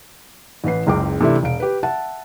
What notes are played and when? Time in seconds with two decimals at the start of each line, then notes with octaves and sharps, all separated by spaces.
0.64 A1 E3 B4 C7
0.87 F#1 C#2 G5 D6
1.21 C3 E3 A3 D4 E4
1.43 E1 F5 D7
1.60 G4 B4
1.83 E5 F#5 A5